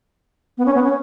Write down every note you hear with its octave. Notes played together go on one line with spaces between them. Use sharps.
B3
C#4
B3
C#4